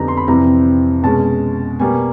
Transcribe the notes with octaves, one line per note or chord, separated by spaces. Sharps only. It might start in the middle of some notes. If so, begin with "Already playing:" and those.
Already playing: F2 D3 G3 B3 D#4 A#5
C6
B5
F2 C3 E3 G3 C4 A#5
B2 G#3 C#4 A5
B2 G3 A#3 G#5